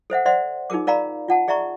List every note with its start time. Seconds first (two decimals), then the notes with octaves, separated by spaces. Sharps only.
0.10 A4 C5 E5 F#5
0.26 C5 D5 E5 F#5 C6
0.70 D#4 F4 G#4 A#4 D6
0.87 A#4 D5 F5 A#5 B5
1.28 F4 F#5 A5
1.48 G#4 D5 E5 A#5 C#6